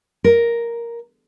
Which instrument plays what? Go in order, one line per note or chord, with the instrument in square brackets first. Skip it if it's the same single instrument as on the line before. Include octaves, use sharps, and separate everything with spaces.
[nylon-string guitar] A#4